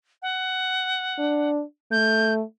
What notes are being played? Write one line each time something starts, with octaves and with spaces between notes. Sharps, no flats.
F#5
D4
A3 G6